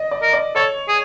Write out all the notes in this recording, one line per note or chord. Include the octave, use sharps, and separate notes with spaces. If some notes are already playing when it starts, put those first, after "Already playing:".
Already playing: D5 D#5
D5
A#4
D5
A4 C#5
G#4